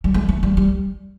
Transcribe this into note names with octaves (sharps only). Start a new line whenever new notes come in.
G3
G#3
A3
G3
G3